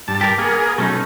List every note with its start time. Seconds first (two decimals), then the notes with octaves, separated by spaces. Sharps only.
0.08 G2 A5
0.21 G4 A#4
0.38 A#3 B3 G#4 A#4
0.78 B2 F#3 A3 C#4 D#4